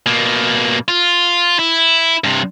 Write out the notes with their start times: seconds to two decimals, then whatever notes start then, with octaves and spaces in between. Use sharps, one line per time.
0.06 B2 A#3
0.88 F4
1.59 E4
2.24 G2 C3